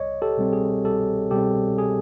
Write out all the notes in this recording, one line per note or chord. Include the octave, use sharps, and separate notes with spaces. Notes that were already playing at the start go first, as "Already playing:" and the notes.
Already playing: C2 C#5 D#5
G4 A4
B2 G3 C4
G#4
C2 G4 A4
B2 G3 C4 G4 A4
G#4